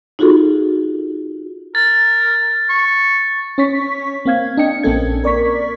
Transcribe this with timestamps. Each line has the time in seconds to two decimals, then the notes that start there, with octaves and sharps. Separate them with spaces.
0.19 D#4 F4 F#4 G#4 A4
1.75 A#4 A6
2.69 C#6
3.58 C#4 C#5 C#6 B6
4.26 A#3 C4 F5 G#6
4.57 D4 D#5 G5 C#7
4.83 A#1 A#3 C4 C#4 A4 G#6
5.24 A#4 D5 C#6 B6